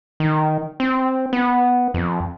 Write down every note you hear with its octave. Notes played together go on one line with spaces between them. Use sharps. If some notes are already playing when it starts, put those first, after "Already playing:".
D#3
C4
B3
F2